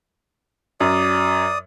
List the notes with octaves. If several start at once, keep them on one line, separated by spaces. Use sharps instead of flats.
F#2 D5 D#6